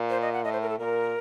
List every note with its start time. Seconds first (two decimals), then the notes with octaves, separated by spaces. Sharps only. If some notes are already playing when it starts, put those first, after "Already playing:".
Already playing: A#2
0.10 C5
0.22 D#5
0.33 F#5
0.44 A2 D#5
0.53 C5
0.62 A#4
0.69 A4
0.78 A#2 A#4